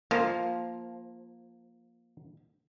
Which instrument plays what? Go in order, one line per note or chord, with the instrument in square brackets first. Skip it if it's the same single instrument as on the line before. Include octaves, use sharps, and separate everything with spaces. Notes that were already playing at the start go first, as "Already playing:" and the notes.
[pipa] F3 [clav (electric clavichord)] A#3 F5